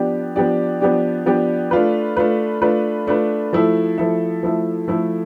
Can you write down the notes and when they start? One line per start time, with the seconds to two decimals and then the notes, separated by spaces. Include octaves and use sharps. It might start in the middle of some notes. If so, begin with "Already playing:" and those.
Already playing: F3 B3 D4 G4 D5
0.36 F3 B3 D4 G4 D5
0.81 F3 B3 D4 G4 D5
1.26 F3 B3 D4 G4 D5
1.71 A3 D4 F4 B4
2.17 A3 D4 F4 B4
2.62 A3 D4 F4 B4
3.07 A3 D4 F4 B4
3.53 F3 A3 E4 A4 E5
3.98 F3 A3 E4 A4 E5
4.43 F3 A3 E4 A4 E5
4.88 F3 A3 E4 A4 E5